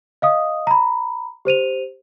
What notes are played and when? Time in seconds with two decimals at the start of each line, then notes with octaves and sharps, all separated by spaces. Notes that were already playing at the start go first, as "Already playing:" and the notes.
0.22 D#5 F5 D#6
0.67 A#5 B5
1.45 G4 C5 D#7 F7